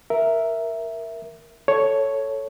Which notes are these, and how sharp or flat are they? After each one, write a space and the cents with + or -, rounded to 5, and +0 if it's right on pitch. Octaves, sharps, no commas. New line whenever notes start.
A#4 +0 E5 +0
A4 +0 C#5 +0